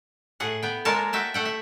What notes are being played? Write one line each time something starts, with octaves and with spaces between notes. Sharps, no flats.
A2 G#4 F#5
B3 G5
G#3 A#3 F4 A#4 C#5 A5
F#4 E5 G5 A5
A3 F#5 G5
E5